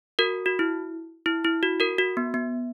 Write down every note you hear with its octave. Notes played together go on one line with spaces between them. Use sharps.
F#4 A#4
F#4
E4
E4
E4
F#4
F#4 A#4
F#4
B3
B3